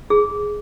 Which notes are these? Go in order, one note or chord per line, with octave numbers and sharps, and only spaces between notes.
G#4